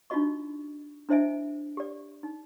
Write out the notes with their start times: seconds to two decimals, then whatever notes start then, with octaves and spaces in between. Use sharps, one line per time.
0.10 D4 D#4 F4 F#4 D#5 C#6
1.09 D4 E4 C5 D#5 E5 G#5
1.77 G4 D5
2.23 D#4